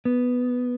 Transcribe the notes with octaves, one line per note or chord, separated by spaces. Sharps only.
B3